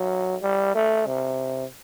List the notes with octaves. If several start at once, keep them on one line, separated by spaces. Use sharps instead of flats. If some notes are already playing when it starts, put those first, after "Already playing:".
Already playing: F#3
G3
A3
C3